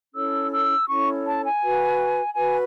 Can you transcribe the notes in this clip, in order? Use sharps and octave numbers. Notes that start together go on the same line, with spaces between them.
C#4 E4 A4 C#5 E6
E6
C#4 E4 A4 C#5 C#6
A5
G#5
F#4 B4
F#4 B4 G#5